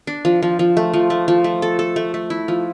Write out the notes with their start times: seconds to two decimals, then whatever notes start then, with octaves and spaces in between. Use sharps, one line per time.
0.07 D4
0.25 F3
0.43 F3
0.59 F3
0.77 A3
0.93 F3
1.10 A3
1.28 F3
1.44 A3
1.62 A4
1.79 A4
1.96 A3
2.14 A3
2.30 E4
2.48 F3